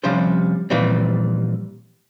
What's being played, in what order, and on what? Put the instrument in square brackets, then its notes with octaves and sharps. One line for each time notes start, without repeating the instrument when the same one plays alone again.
[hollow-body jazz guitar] C3 F3 G3 C#4 D4 C5
A#2 E3 F3 G3 C4